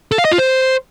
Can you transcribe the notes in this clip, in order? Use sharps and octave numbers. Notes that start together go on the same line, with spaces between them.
A4
F5
D#5
F4
C5